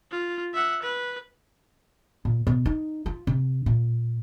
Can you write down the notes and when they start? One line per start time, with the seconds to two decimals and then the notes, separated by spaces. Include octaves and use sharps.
0.11 F4
0.54 E5 F#5
0.83 B4
2.25 A#2
2.47 B2
2.66 D#4
3.06 F4
3.27 C3
3.66 A#2